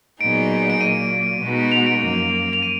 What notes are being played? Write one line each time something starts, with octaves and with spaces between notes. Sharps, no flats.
A#2 F#3 B3 D#4 G#4 D7
D7
A#2 F#3 A#3 D#7
B2 G#3 B3 D#4 F#4
F7
D7
F#2 F3 A#3
F7
D#7